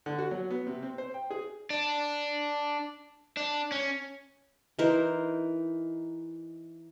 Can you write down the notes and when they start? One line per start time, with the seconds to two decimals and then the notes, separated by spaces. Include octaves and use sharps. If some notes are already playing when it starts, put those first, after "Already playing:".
0.06 D3
0.18 F#4
0.31 F#3
0.50 B3
0.67 C3
0.83 C4
0.98 C5
1.14 G5
1.31 G#4
1.70 D4
3.37 D4
3.72 C#4
4.79 E3 D#4 A#4 C5